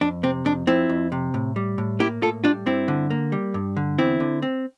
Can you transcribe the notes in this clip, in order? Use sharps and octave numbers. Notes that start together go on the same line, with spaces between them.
F2 D4
C3 C4
F2 D4
F3 C4 E4
F2
C3
A2
G3
A2
A#3 E4 G4
A2 F4 A4
G3 D4 F4
G2 C4 E4
D3
A#3
G3
G2
D3
E2 C4 E4
D3
C4